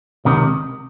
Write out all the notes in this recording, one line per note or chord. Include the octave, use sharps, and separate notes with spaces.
C#2 C3 D#3